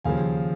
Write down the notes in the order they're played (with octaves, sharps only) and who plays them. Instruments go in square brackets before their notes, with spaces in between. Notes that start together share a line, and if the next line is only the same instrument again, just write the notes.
[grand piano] D#2 C#3 F3 F5 G#5